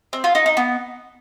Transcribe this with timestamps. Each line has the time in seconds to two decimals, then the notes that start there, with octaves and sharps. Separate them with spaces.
0.13 C4
0.24 F4
0.35 D#4
0.46 D#4
0.57 B3